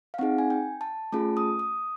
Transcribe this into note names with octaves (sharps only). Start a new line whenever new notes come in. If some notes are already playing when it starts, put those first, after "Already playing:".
F5
C4 D#4 G#4 F#5
G#5
G5
A5
A3 C#4 F4 G#4 A5
D#6
D#6